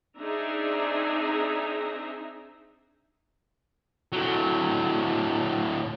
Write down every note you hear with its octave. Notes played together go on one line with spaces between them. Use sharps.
C4 D4 D#4 G#4 E5 A#5
A2 F#3